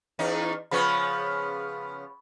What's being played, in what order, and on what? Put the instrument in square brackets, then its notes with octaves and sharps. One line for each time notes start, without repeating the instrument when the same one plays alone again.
[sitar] E2 C#4 D#4
[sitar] C#3 F3 B3 [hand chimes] B5 C#6